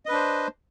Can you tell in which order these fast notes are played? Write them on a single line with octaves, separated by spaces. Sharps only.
D#5 B4 D4 C5